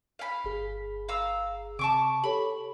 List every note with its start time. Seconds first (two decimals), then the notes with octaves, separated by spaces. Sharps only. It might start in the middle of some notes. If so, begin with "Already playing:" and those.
0.19 F5 B5
0.45 G1 G#4
1.09 F5 A#5 E6
1.79 C3 A5 C#6 D6
2.24 G4 A4 C#5 B5